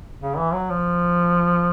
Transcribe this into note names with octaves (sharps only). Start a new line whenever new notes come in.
C#3
E3
F#3
F3